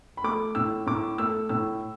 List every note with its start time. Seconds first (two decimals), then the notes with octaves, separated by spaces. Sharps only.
0.17 B5
0.24 A3 D6
0.55 A2 E6
0.86 A2 D6
1.18 A3 E6
1.49 A2 E6